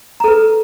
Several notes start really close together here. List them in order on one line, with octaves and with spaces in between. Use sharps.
A#5 A4 B4